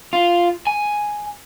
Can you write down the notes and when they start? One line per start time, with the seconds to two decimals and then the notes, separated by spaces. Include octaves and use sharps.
0.13 F4
0.67 G#5